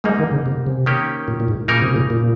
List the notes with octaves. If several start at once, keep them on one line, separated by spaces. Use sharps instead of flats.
G#2 G3 G#3 A#3 D#4
D#3
C#3
C3
C3
D#3 A#3 C#4 G4
A#2
A#2
G#2
A#2 C#3 G3 A#3 D#4 A#4
C3
A#2
A#2